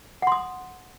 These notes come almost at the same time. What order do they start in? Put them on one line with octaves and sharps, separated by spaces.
F#5 C6 D#6